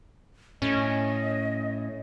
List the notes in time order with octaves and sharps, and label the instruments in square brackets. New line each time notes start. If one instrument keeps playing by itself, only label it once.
[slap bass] A2 [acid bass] C#4 [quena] D#5